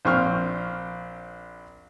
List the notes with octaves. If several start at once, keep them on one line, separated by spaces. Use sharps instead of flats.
A#1 C4 C#6 F6